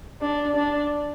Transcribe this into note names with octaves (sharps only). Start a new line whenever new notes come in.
D4
D4